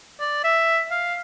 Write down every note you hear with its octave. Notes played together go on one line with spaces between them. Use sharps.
D5
E5
F5